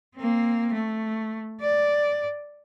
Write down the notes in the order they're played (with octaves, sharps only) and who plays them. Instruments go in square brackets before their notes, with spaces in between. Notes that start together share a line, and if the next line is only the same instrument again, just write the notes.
[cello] A#3 C4
A3
D5